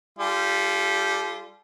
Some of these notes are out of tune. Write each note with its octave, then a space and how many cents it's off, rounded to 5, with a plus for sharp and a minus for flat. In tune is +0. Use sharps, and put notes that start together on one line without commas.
G3 +0 F4 -25 A4 -40